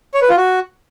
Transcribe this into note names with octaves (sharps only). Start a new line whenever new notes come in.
C#5
B4
F4
F#4